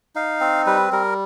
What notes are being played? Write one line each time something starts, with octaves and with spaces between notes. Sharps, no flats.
D#4 F5
C4
G3 B4
G3 A#4